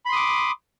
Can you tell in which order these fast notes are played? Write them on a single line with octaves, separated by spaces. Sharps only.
B5 C6 D#6 D6